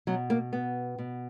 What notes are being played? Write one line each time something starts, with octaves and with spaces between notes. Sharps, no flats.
B2 F#3
A#3
B3
B2